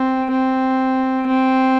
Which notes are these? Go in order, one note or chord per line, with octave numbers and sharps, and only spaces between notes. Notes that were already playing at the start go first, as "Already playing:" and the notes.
Already playing: C4
C4
C4